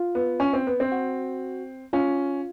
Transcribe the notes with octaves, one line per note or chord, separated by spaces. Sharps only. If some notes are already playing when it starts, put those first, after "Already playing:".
Already playing: F4
B3
C#4
C4
B3
C4
F#4
C#4 F4